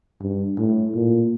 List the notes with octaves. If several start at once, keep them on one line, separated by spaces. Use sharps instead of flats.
G2
A2
A#2